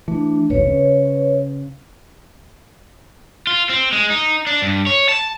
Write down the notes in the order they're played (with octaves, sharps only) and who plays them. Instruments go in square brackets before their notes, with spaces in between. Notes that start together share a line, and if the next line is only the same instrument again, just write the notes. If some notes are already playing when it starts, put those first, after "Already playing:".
[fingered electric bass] E3 [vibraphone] A3 D4
[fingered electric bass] G#1 D#2 B2 [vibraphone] B4 C#5
[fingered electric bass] C#3
[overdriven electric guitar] F4
C4
G#3
D#4
D4
G2
C#5
A5